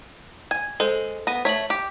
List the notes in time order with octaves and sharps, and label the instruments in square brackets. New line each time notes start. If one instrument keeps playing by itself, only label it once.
[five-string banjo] G#5 [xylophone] G#6
[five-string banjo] G#3 [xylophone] A4 C5
[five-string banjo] B3 [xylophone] A#6 D#7
[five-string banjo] A3 C#5 [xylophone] B6 F#7
[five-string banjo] G4